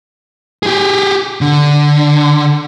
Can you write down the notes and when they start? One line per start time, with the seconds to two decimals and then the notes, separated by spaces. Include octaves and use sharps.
0.63 G4 G#4
1.41 D3